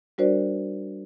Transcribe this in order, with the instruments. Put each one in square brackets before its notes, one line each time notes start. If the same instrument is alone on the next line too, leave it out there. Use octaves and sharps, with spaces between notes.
[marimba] G3 D4 F#4 A#4 C5 D5